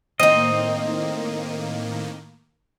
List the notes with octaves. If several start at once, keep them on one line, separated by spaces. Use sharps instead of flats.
A2 D#3 A#3 C4 D#4 D#5